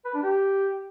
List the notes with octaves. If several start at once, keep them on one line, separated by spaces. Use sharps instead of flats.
B4
D4
G4